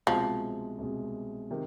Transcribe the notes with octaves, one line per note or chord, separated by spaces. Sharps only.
C2 B2 F3 G#3
C2 B2 G#3
C3 D#3